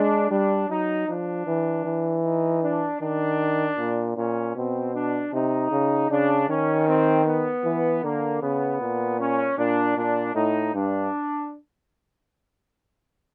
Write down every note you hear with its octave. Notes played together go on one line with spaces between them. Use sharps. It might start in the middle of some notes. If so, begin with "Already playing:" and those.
Already playing: G#3 D4
G3 D4
F#3 D#4
F3 D4
E3
E3
D#4
D4
D#3 D4
A#2
A#2 C#4
B2 C4
D4
C3 D#4
C#3
C#3 D4
D#3 C#4
C4
B3
E3
D3 A#3
C#3 B3
A#2
C#4
A#2 D4
A#2 D4
A2 D#4
G2 D4